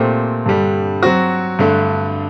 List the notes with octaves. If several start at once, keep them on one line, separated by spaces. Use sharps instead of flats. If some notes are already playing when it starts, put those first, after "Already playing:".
Already playing: A#2 A3 C4 G4
G2 D3 G3
F#3 C4 F#4
G2 D3 A3